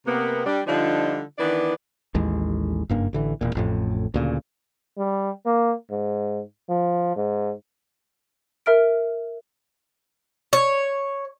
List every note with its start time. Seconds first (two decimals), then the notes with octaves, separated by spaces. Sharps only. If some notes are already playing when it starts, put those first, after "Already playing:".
0.06 C3 A#3 B3
0.46 G3 D4
0.67 D3 F3 G3 D4 D#4 F4
1.38 D#3 E3 B3 D4 D5
2.15 A1 D#2 G#3
2.89 F#1 G2 A#3
3.13 A1 D3 E3
3.41 E1 A#2
3.55 A1 F2 A2
4.14 D2 A#2 C#3
4.98 G3
5.46 A#3
5.91 G#2
6.69 F3
7.16 G#2
8.66 A#4 E5 F6 D7
10.53 C#5